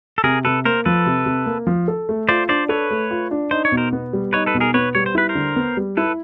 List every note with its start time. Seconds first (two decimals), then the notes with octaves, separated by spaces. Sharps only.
0.18 A4
0.23 C3 G#4 A#4
0.45 C3 A4 B4
0.65 A#3 A#4 C5
0.85 F3 A4 B4
1.06 C3
1.26 C3
1.46 A#3
1.67 F3
1.88 A4
2.09 A3
2.29 F4 C5 D5
2.49 D4 C5 D5
2.69 A4 B4 C#5
2.91 A3
3.11 F4
3.31 D4
3.51 D#4 C5
3.65 C#5
3.72 B2
3.77 A#4 C5
3.93 B3
4.13 G3
4.33 D#4 B4 C#5
4.46 A4 B4
4.54 B2
4.60 G#4 A#4
4.74 B3 B4 C#5
4.95 G3 C#5
5.06 C5
5.15 E4 B4
5.29 A#4 C5
5.35 D3
5.56 B3
5.77 G3
5.97 E4 A4 B4